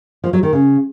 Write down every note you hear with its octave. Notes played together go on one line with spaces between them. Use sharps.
F3
F#3
D#3
C#3